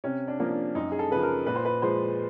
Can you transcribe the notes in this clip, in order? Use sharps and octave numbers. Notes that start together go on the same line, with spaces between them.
C3 C#4
D4
F3 A#3 C#4
D4
F#2 D#4
G#4
A4
C#3 F3 B4
A#4
A#2 B4
C5
B4
F3 G#3 C5